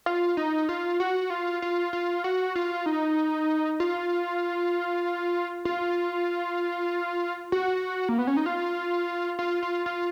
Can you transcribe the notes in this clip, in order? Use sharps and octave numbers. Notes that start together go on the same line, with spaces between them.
F4
D#4
F4
F#4
F4
F4
F4
F#4
F4
D#4
F4
F4
F#4
A#3
B3
C#4
D#4
F4
F4
F4
F4